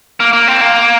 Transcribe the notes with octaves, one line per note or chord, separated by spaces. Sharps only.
A#3
A#3
C4
A#3